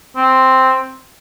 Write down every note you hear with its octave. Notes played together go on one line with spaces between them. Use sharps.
C4